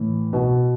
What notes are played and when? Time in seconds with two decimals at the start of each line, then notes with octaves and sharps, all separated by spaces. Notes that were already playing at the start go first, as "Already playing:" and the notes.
Already playing: A2 E3
0.33 B2